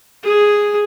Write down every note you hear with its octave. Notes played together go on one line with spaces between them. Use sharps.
G#4